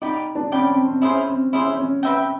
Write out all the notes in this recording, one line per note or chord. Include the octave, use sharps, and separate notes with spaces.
D#4 D5 G5 B5 D6
D4
C#4 D5 G5 B5 D6
C4
C4
C#4 E4 G#4 C5
C4
C#4 E4 G#4 C5
C#4
B4 E5 G5 A#5